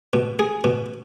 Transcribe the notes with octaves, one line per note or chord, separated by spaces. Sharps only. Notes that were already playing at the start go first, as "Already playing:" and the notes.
B2
G#4
B2